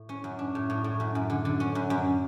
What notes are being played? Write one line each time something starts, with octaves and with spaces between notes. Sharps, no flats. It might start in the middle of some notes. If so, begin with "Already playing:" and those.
Already playing: A2
C#4
F#2
D4
A2
A2
A2
F#2
F#2
D3
D3
C#4
F#2
F#2